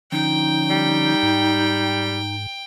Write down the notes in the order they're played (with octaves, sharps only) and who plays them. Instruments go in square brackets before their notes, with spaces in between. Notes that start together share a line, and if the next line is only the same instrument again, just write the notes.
[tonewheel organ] D3 F3 C#4 [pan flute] D#4 [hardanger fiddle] G5
[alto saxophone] G3
[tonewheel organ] G#2